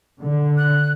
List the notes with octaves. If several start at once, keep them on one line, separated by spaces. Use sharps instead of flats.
D3
F#6